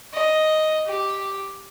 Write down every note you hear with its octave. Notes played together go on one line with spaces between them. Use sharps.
D#5
G4